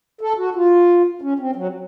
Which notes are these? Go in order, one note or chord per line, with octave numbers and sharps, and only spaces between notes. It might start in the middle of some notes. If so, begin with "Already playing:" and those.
A4
F#4
F4
C#4
C4
F#3